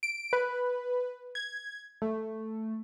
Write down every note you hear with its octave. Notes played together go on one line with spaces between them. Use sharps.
D7
B4
G#6
A3